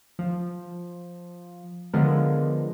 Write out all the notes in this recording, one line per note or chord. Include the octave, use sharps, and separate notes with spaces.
F3
D3 F3 G#3 B3 F4 A#4